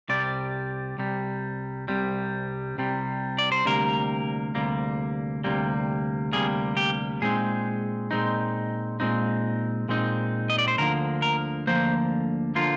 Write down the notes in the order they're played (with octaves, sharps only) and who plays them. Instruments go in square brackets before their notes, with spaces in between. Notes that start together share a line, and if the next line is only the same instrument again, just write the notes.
[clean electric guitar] C2 C3 G3 D5
C2 C3 G3
C2 C3 G3
C2 C3 G3
D5
C5
D2 C3 G3 A#3 A#4
D2 C3 G3 A#3
D2 C3 G3 A#3
D2 C3 G3 A#3 G#4
G4
A#2 G#3 C4 D#4 G#4
A#2 G#3 C4 D#4
A#2 G#3 C4 D#4
A#2 G#3 C4 D#4
D#5
D5
C5
D2 D3 F3 A#3 A#4
A#4
D2 D3 F3 A#3 C5
D3 F3 A#3 F4